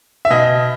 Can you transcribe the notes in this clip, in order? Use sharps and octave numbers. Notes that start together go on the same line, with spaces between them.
E5
B2 D#5